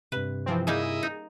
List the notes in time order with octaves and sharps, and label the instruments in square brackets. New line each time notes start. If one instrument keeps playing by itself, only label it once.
[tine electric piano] G2 C3 [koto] B4
[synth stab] E3 F3 C4
[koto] G3 A#3 D#4 [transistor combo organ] E4 D#5 [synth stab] G#4
[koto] D#4